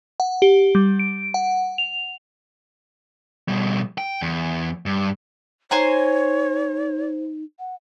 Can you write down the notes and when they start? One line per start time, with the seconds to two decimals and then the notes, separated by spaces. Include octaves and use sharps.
0.20 F#5
0.42 G4
0.75 G3
0.99 D7
1.34 F#5
1.78 F7
3.48 B2 G3
3.98 G5
4.22 E2
4.86 G2
5.71 D#4 C5 C#5 G#5 A#5
7.59 F#5